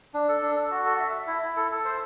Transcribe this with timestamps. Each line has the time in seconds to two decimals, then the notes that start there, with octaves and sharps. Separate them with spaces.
0.14 D4
0.28 A4
0.42 D4
0.56 A4
0.71 F#4
0.85 A4
1.00 E5
1.13 E5
1.27 E4
1.42 E4
1.56 A4
1.71 A4
1.85 C5